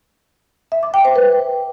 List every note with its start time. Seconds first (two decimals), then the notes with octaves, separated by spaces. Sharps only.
0.72 E5
0.83 D6
0.94 G5
1.05 C5
1.16 B4